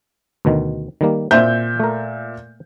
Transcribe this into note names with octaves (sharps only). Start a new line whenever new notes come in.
D2 B2 D#3
D#3 G3 A#3
A#2 C4 C5 E5 G6
A3 A#4